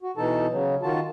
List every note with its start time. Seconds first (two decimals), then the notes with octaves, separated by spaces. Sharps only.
0.03 F#4
0.17 B2 E3 D#4 A4 A5
0.51 C#3 F#3
0.83 D#3 F4 F#4 A5